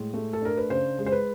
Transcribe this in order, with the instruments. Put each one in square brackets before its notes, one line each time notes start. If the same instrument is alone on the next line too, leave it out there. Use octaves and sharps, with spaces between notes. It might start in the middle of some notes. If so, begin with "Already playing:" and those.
Already playing: [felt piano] A2 G#3
A3
A4
D4 A#4
B4
C#3 C5
G#3
C5
B4